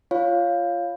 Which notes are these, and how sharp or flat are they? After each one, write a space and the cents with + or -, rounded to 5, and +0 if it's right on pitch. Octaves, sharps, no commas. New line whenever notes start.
F4 -15 C#5 +0 F5 +0